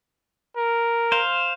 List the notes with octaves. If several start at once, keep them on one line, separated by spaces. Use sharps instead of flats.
A#4
C5 F5